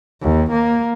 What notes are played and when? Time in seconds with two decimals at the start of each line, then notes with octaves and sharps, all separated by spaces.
0.22 D#2
0.51 A#3